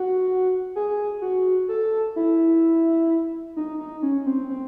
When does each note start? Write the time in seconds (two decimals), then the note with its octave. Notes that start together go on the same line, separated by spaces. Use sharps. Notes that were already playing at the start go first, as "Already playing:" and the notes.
Already playing: F#4
0.76 G#4
1.22 F#4
1.69 A4
2.16 E4
3.56 D#4
3.79 D#4
4.02 C#4
4.26 C4
4.49 C4